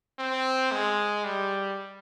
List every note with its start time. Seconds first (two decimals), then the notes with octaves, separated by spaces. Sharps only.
0.19 C4
0.72 G#3
1.24 G3